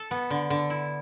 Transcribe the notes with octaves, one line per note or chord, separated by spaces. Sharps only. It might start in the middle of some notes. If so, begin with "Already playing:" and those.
Already playing: A4
B3
D3
D3
E4